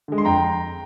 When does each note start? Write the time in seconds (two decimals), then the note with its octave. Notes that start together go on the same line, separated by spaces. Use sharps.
0.08 D3 G#3
0.18 C6
0.25 F2 G5 A#5